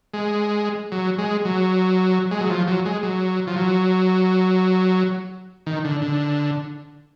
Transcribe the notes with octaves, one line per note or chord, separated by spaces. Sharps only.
G#3
F#3
G#3
F#3
G#3
F#3
F3
F#3
G#3
F#3
F3
F#3
D#3
D3
D3